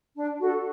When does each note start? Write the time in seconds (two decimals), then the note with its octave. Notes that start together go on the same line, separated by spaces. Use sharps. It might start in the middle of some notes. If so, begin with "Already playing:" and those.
0.15 D4
0.40 F#4 A4